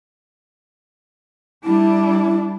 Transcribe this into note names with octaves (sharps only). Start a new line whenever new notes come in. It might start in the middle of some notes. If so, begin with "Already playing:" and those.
G3 D4 E4